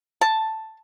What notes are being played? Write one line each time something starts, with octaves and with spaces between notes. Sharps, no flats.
A5